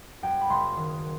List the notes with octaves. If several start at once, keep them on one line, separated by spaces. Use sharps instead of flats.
F#2 G5
B5
F#1 C6
D#3